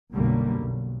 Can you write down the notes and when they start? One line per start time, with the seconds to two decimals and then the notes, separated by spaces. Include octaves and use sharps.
0.12 B1 F#2 B2 D3 G3 A#3
0.58 B1